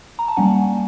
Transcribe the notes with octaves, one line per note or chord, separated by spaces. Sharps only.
A#5
A5
G3 A#3 C#4 F#5 G#5